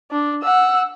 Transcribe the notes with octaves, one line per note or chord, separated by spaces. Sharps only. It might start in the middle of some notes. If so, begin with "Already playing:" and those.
D4
F#5 E6